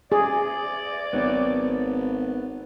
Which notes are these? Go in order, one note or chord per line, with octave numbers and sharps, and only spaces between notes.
G#4 D5
G#1 B3 C#5